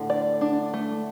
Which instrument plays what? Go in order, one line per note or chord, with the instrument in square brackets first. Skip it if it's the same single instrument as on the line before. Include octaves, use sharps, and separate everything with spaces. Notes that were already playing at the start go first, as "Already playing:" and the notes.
Already playing: [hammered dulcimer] A2 D3
[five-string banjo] D5
D4
A3